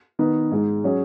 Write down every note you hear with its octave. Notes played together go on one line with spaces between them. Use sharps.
D#3 B3 D#4
G#2 G#3 D#4
F#3 C#4 G#4